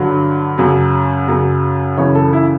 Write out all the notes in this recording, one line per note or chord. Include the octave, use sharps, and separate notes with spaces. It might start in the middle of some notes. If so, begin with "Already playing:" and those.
Already playing: G2 D3 F#3
F#2 C#3 F#3
F#2 C#3 F#3
F#2 C#3 E3 C#5
A4
E4